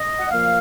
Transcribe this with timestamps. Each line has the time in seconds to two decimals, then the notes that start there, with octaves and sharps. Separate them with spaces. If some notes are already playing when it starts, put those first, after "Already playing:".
Already playing: D#5
0.19 F#5
0.30 A#2 F3 A#3 F5